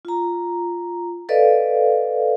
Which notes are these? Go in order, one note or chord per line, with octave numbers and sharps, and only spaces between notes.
F4 A#5
A4 B4 D5 D#5 F5